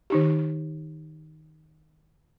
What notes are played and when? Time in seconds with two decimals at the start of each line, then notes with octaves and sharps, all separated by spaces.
0.10 D#3 D#4 G4